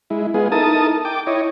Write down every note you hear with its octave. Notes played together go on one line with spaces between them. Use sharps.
G#3 E4
G#3 B3 F4 G#4
D#4 E4 A4 A#4 A5 D#6
G5 D6
E4 C#5 D#5